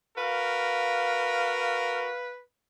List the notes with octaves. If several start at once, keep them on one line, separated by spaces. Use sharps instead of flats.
F#4 A#4 B4 F5